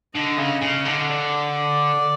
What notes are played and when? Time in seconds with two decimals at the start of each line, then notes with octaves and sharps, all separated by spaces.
0.15 D3 D#5
0.38 C#3
0.61 C#3
0.85 D3
1.09 D5